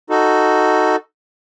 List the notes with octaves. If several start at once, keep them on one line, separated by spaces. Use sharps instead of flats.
D#4 F#4 A4